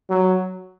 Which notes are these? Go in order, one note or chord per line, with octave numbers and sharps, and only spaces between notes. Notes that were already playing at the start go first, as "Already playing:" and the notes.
F#3